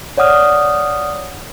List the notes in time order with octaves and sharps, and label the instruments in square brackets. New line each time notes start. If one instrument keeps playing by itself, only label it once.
[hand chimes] C#5 D5 F#5 D#6 F6